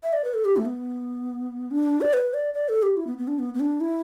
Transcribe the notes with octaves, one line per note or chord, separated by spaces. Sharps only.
E5
D5
B4
A4
G4
A3
B3
D4
D5
B4
D5
D5
A4
G4
E4
B3
B3
D4
B3
B3
D4
E4